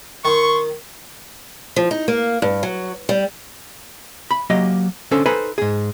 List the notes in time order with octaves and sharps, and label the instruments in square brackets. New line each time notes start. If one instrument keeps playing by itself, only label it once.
[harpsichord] D#3 [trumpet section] C6 C#6
[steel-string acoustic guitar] F3
D#4
A#3
G2
F#3
G3
[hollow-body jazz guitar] B5
F#3 A#3 G4 D#5
D3 C#4 A4 C5
D#4 A4 B4 C5 G#5 B5
G#2 G#4